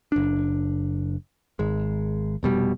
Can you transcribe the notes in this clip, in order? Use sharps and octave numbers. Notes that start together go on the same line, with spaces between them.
F#1 D4
G#1 G#3
F1 B2 G3